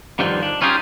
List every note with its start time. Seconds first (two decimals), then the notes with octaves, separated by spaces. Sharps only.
0.19 G2 D3 D#3 F3
0.43 D4
0.62 C#4 D#4 F4 G4 G#4